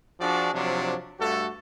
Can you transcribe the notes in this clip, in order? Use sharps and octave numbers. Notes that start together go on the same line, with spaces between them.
F3 D4 F#4 G#4 D5
C3 F3 F#3 D4
G2 A3 F#4 A4